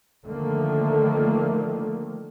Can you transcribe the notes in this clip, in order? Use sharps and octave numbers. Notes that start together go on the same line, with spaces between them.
D3 D#3 F3 A3 A#3